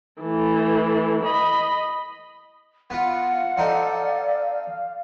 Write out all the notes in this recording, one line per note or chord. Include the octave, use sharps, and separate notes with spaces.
E3 A3
D#5 B5
B3 F4 F5 F#5
C4 D#4 A4 D5